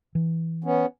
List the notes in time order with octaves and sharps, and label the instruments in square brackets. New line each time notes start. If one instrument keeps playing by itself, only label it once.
[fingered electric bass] E3
[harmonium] B3 C#4